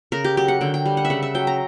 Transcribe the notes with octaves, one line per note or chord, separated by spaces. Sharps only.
C#3 A#4
G4
F#3 G4
F#5
D3 G5
G5
G3
F#5
E5
C#3 F#5
E5
F#3 G5
A#5